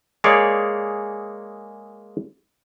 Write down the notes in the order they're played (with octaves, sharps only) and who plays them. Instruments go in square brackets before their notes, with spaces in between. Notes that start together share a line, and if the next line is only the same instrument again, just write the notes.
[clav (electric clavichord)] G#3 A#3 G#4 C#5 D5